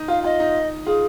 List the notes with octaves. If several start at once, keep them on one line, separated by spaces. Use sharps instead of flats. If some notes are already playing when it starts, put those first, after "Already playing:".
Already playing: D#4
F4 F5
F4 D#5
D#4
F4 G#4